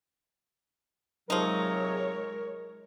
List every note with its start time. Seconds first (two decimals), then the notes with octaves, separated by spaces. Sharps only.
1.30 C3 F3 F#3 G#3 D#4 A#4 C#5